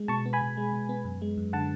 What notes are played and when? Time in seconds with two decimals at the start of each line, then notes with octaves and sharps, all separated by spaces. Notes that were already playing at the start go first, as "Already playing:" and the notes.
Already playing: G#3
0.08 B2 A5 C#6
0.25 B3
0.33 G#5 B5
0.41 B2
0.57 G#3
0.73 B2
0.89 B3
1.05 F#2
1.22 G#3
1.38 F#2
1.53 D3 F#5 A5